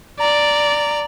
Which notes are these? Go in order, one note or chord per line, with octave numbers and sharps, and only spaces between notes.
D5 A#5